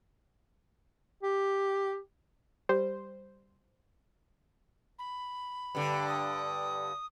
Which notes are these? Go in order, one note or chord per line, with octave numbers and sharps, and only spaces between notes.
G4
G3 C5
B5
G2 D3
D#6